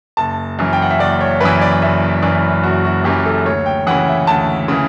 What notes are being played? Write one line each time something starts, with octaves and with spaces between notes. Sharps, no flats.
F#1 A5
F#2 E3
G5
F#5
E5
F#1 D5
C#5
F#2 E3 B4
D5
F#1 E5
F#2 E3 D5
F#1 F#4
F#4
F#2 E3 G4
A4
D2 C#5
G5
C#3 E3 F#5
E5
D2 A5
C#3 E3